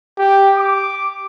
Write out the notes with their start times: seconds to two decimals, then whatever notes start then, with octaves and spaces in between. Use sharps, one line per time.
0.18 G4
0.58 D6